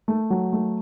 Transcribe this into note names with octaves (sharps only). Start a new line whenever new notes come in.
A3
F#3
A3